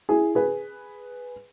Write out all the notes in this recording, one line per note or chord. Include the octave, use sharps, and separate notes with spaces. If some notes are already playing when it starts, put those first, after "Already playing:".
E4 G#4
G#4 B4